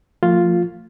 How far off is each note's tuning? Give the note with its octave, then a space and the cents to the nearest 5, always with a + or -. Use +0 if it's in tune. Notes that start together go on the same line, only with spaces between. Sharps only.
F3 +0 A3 +40 F4 +0